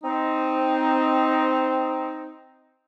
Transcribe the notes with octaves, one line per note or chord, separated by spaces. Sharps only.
C4 D#4